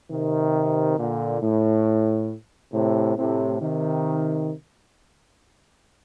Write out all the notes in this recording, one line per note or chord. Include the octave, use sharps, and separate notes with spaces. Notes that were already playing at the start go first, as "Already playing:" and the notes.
C3 D#3
A#2 D3
A2
A2 C3
A2 C3
C3 D#3